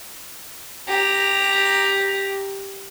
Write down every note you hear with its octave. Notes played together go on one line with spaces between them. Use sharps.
G4 A#5